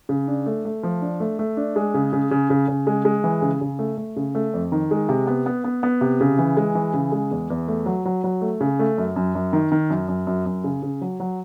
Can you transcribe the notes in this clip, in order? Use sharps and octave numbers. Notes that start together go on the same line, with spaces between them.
C#3
D4
A3
A3
F3
D4
A3
A3
D4
G#3
C#3
C#3
C#3
C#3
C#3
G#3
G#3
E3
C#3
C#3
A3
A3
C#3
A3
F2
D#3
G#3
C3
B3
B3
B3
B3
C3
C#3
E3
G#3
E3
C#3
G#3
E2
E2
A3
F#3
F#3
F#3
A3
C#3
A3
F#2
F#2
F#2
D#3
D#3
F#2
F#2
F#2
F#2
C#3
C#3
F#3
F#3